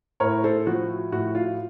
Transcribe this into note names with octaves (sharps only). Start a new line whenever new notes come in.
A2 A#4 C#5
A4 C5
F3 F#4
A2 F#4
F4